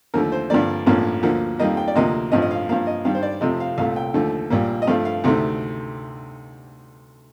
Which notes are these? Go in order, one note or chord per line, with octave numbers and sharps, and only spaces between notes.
D#2 D3 F3 A3 A#4
C5
G2 D3 F3 A#3 D5
A1 G2 F3 A#3
D2 D3 F3 A#3
F2 D#3 G3 A#3 D#5
G5
D5
D2 C3 F3 A#3 D#5
A1 G2 F3 D#5
D#5
F5
G2 F3 A#3 F5
D#5
G2 D#3 G3 F5
C5
D5
F2 C3 F3 A3 D#5
F5
C2 A#2 A3 F5
G5
D#2 D3 F3 A3
A#1 A#2 G3 A#3
D#5
G2 F3 A3 F5
F5
D2 C3 D#3 A3